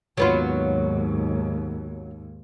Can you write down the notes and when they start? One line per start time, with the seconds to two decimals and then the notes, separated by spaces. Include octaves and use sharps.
0.17 D#2 G#2 F#3 B3 F4